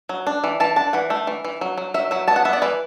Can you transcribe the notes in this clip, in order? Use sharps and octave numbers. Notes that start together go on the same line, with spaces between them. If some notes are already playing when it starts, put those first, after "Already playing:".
F#3
D4
E3
E3 A5
D4 A5
E3 F#5
A3
E3
E3
F#3
F#3
F#3 E5
F#3 E5
B3 A5
F#5
B3 E5
D5
E3 B4